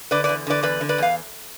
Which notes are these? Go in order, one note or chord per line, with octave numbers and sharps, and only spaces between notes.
D3 B4 D5
B4 D5
E2
D3 B4 D5
E2 B4 D5
D3
B4 D5
E2 F5